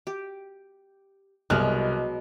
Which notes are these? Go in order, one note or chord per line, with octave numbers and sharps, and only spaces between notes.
G4
C2 B2 F#3 G#3 F6 F#6